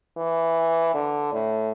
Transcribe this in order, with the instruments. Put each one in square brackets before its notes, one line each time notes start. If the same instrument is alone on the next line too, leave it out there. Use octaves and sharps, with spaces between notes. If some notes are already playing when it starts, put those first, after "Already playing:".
[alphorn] E3
D3
A2